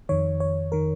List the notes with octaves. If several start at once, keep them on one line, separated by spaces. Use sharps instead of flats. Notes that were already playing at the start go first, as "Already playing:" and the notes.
F2 D#3 C#5
C#5
D#3 A#4